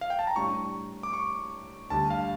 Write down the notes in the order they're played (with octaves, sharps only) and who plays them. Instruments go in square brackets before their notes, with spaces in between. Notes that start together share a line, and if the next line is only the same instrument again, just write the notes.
[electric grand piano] F5
G5
A5
A#5
[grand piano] A2 G3 D4 G4 [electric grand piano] C#6
[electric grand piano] D6
C#6
[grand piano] D2 D3 G3 [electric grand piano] A5
[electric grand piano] F5